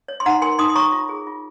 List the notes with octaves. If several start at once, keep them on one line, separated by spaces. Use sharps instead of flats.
C#5
C6
D#4 F#5 A#5
A#4 G#5 C6
D#4 C6 D#6
D#6
C#5 A#5 C#6
F4
G#4
F4